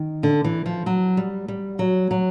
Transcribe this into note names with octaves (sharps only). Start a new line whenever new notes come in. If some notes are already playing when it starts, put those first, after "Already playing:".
Already playing: D#3
D3
E3
F3
F#3
G3
G3
F#3
F#3